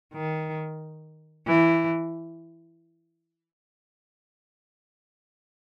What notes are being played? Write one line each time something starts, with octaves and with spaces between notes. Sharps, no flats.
D#3
E3